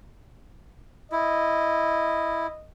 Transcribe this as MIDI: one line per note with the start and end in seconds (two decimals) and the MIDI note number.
1.12 2.47 64
1.12 2.68 75